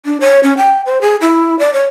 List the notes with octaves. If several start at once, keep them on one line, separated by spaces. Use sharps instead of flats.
D4
C#5
C#4
G5
C5
G#4
E4
D5
C#5